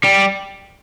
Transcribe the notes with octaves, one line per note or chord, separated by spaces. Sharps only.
G3